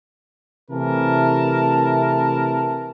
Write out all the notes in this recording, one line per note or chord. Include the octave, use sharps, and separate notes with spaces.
C3 E3 A3 A#4 A5